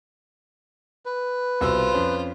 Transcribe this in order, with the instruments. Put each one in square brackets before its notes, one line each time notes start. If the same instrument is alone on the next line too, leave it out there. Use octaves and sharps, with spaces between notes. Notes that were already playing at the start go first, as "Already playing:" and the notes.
[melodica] B4
[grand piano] C2 B2 E6 [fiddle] F4 C5
[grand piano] F2 C#4